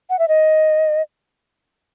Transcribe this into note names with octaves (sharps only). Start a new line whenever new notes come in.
F#5
E5
D#5